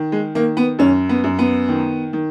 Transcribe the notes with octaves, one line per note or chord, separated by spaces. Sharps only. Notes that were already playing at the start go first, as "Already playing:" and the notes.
Already playing: D#3
G#3
D#3 A#3
B3
F#2 C#4
B3
F#2
B3
D#3
D#3